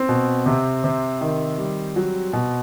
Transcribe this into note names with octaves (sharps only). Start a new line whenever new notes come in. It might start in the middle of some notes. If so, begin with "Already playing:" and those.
Already playing: C4
B2
C3
C3
D#3
G3
F#3
B2